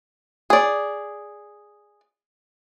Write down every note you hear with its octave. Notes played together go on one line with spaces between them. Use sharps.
G#4 D5